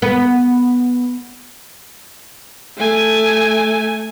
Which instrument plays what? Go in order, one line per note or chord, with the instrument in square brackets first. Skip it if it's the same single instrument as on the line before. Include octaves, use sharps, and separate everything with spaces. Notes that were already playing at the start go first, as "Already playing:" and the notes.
[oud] B3
[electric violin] A3 G#5